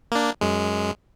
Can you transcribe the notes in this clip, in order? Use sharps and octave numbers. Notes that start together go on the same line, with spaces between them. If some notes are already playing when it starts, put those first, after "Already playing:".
A#3 D4
F#2 G#3